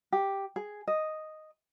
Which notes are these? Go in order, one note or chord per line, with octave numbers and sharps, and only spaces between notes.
G4
G#4
D#5